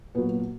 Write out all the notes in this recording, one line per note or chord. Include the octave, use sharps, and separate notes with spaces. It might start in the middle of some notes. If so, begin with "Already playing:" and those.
A#2 F#3 B3